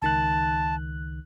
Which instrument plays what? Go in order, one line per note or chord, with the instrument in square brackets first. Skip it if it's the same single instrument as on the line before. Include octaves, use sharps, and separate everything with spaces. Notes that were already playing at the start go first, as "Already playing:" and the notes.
[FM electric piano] C#2 D#3 F#6 [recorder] A5